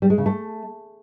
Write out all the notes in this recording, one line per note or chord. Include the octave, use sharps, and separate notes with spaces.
G3
G#3
C#3
A3